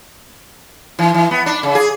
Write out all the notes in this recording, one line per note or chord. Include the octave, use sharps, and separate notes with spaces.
E3
E3
B3
D4
C#3
G#4